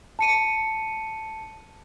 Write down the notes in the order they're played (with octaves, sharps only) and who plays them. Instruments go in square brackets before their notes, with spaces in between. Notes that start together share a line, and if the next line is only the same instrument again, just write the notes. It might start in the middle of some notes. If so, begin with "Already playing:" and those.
[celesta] A5 C#7 D#7